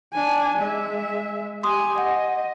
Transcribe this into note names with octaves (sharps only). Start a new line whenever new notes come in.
D4 G#5
G#3 E5
G4 G#5 C6 D#6
D#5 F#5